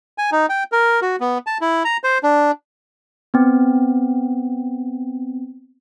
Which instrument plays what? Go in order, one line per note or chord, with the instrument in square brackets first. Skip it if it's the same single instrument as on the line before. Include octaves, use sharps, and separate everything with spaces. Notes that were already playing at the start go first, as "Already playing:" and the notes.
[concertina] G#5
D#4
G5
A#4
F#4
B3
A5
E4
A#5
C5
D4
[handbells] B3 C4